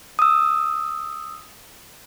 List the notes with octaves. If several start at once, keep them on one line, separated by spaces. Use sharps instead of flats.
D#6 E6